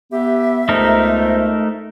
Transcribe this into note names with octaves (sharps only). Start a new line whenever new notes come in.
B3 G4 E5
C#2 A3 B3 D#4 A#4 C5